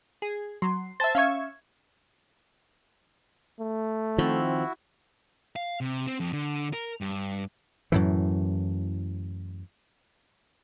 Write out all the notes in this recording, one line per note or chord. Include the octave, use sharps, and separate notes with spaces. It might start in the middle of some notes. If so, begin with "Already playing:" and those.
G#4
F#3 C6
C5 E5 A5 A6
C#4 E5 F5 C#6 G#6
A3
D#3 F3 C4 E4 F#4
F5
C3
C4
F2
D3
A#4
G2
F#2 A2 E3